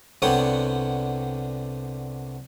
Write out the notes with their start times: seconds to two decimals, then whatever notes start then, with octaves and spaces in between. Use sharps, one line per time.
0.22 C2 D3 B3 C#5 F#5 G5